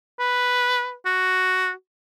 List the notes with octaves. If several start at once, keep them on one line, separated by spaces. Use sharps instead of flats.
B4
F#4